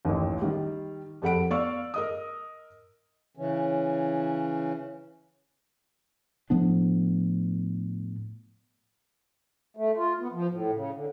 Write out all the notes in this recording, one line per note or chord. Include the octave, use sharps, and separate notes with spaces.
A1 D#2
D#3 G3
F2 G4 A4 F#5 B5 D7
B3 D5 F5 C#6 E6
A#4 D#5 D#6
C#3 E3 C#4
A2 F3 B3 D4
A3
F4
B3
F3
A2
C#3
D3